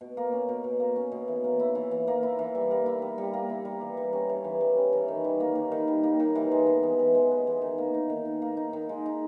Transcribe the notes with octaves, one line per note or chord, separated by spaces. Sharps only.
B2
A#3
C#4
B2
B2
A#3
C#4
B2
E3
A#3
E4
E3
E3
A#3
E4
E3
G3
A#3
E4
G3
G3
A#3
E4
G3
E3
G3
C#4
E3
E3
G3
C#4
E3
D#3
G3
A#3
D#3
D#3
G3
A#3
D#3
E3
G#3
B3
E3
E3
G#3
B3
E3
D#3
A#3
D#4
D#3
D#3
A#3
D#4
D#3
G#3
D#4